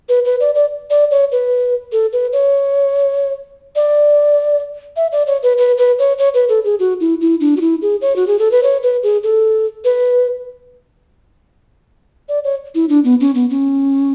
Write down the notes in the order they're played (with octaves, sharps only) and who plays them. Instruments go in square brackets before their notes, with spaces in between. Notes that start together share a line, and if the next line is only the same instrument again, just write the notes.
[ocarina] B4
B4
D5
D5
D5
C#5
B4
A4
B4
C#5
D5
E5
D5
C#5
B4
B4
B4
C#5
C#5
B4
A4
G#4
F#4
E4
E4
D4
F#4
E4
G#4
C#5
F#4
G#4
A4
B4
C#5
B4
G#4
A4
B4
D5
C#5
E4
D4
B3
C#4
B3
C#4